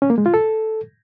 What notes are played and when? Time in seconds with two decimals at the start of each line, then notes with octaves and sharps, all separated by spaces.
0.02 C#4
0.10 A#3
0.18 G#3
0.26 F4
0.34 A4